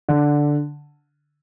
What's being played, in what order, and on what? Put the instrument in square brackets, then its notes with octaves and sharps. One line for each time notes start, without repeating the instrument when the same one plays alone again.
[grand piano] D3